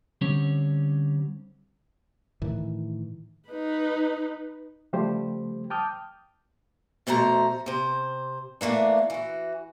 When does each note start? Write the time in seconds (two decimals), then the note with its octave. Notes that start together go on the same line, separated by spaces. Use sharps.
0.21 D3 G3 C4 C#4 C#5
2.42 A2 D#3 E3
3.49 D#4 B4
4.93 C#3 F3 G3 A3 G4 C5
5.70 G5 A5 D6 D#6 F6 G6
7.07 F2 B2 A3 C5 A#5
7.66 C3 C5
8.61 E3 A3 A#3 D4
9.10 E3 F#4